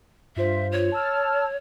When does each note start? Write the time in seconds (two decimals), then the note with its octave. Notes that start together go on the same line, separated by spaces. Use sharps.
0.36 G2 F4 C5 E5
0.72 C#5
0.92 A5 E6 F6